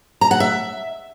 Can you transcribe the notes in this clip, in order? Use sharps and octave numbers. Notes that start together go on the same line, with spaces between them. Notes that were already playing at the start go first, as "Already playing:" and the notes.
A#5
F#5
E5